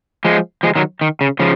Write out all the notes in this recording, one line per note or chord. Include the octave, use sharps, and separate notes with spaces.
F3 G#3
F3 G#3
D#3 F#3
D#3
C#3
C#3 F3